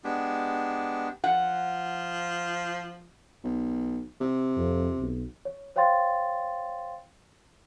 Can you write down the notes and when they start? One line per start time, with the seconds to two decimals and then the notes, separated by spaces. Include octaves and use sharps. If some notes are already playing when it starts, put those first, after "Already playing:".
0.04 G#3 B3 D4 G4
1.24 F3 F#5
3.44 B1
4.20 C3
4.57 F2
4.99 B1
5.45 C#5
5.76 C5 C#5 F5 G5 C6 A6